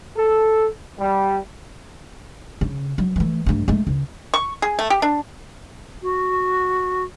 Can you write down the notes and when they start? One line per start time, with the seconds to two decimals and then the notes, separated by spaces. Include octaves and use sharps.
0.17 A4
0.98 G3
2.61 C#3
2.98 F#3
3.16 E3 A3
3.46 G2 A3
3.68 G#3 A3
3.87 C#2
4.34 C#6
4.62 G#4
4.79 A3
4.90 G4
5.02 D4
6.02 F#4